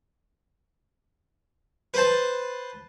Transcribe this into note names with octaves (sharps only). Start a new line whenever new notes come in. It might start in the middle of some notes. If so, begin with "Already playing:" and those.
B4 C5 A5